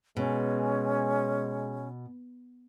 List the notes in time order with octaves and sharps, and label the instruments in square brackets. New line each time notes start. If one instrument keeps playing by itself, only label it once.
[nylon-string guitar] B2 [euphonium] G#3 [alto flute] C#4